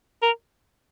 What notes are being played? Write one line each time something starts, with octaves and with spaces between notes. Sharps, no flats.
A#4